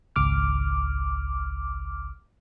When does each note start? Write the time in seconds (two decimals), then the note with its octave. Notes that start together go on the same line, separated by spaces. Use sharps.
0.16 G#1 C#2 D6 F6